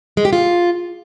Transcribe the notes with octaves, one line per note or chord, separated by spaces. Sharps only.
G#3
G4
F4